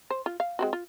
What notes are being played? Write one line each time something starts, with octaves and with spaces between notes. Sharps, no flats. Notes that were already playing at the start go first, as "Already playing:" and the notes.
C5
F4
F5
G#3 C4 F#4
F4